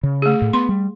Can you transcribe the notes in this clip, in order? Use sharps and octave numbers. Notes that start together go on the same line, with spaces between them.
C#3
A3 G#4
A2
B3 C6
G3